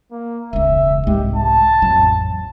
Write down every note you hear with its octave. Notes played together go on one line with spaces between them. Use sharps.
A#3
E1 C#2 E5
C2 G#2 G#3 G4
A5
A1 F2 F#3